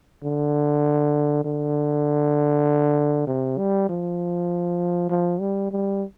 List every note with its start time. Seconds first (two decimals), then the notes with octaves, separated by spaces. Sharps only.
0.24 D3
1.45 D3
3.27 C3
3.58 G3
3.89 F3
5.10 F3
5.40 G3
5.71 G3